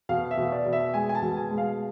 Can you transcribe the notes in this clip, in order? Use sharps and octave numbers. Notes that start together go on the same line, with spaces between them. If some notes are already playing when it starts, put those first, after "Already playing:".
B2 F5
E5
B2
D5
B2
E5
G#3 G#5
G#5
A5
B2
G#5
G#3
F5